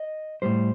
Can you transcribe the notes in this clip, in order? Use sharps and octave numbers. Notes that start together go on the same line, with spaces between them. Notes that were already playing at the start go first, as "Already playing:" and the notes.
Already playing: D#5
A2 G3 C5